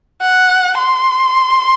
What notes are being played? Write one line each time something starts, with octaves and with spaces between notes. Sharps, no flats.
F#5
C6